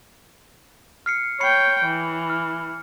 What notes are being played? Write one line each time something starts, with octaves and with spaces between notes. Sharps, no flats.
F6 C7 C#7
C#5 G5 B5 C7 C#7
E3
F6